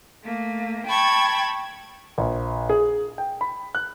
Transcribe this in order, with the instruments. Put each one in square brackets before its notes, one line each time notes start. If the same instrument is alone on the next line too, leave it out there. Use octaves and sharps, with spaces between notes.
[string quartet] A3 A#3
G5 A5 B5 C#6 G#6
[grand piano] A#1
G#4
G5
B5
F#6